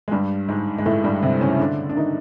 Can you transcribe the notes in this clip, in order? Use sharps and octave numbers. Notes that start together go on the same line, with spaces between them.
G#3
G2 G3
G#2 G#3
G#3
A2 A3
G2 G3
C3 C4
C#3 C#4
D3 D4
D4
D#3 D#4